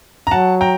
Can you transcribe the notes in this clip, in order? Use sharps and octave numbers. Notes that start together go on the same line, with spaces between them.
A#5
F#3 F#5 A5
G5 A#5